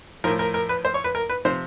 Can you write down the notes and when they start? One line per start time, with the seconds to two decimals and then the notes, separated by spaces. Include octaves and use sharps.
0.24 F3 A#4
0.27 A2
0.39 A#4
0.54 A#4
0.69 B4
0.85 C5
0.94 C#5
1.04 B4
1.15 A#4
1.29 B4
1.45 C3 F3 C5